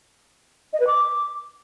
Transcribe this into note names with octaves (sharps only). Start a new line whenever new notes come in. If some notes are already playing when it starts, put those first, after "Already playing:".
D#5
B4
D6